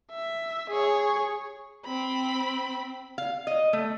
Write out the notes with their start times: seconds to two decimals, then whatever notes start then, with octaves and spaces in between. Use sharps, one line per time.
0.11 E5
0.69 G#4 C#5
1.85 C4 B5
3.18 F5
3.47 D#5
3.73 A3